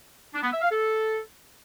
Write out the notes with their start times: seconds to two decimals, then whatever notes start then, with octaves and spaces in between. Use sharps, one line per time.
0.33 D4
0.43 B3
0.52 E5
0.62 F5
0.71 A4